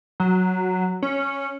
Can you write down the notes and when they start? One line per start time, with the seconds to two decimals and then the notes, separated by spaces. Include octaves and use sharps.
0.20 F#3
1.02 C#4